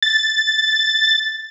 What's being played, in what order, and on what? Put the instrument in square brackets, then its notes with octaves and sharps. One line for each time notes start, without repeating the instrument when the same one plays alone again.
[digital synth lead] A6